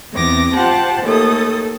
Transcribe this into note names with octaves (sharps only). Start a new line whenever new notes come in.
E2 B3 C4 D6 A#6
F4 G4 C5 F#5 A5
D#2 A3 A#3 A4 D#6